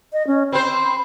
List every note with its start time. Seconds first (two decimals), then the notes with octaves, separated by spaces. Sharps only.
0.13 D#5
0.27 C#4
0.52 C4 C5 B5